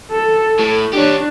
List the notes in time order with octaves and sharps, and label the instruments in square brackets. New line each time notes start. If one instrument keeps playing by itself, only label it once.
[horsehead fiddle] A4
[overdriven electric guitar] A2
[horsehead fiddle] D4 [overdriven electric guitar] G4 C#5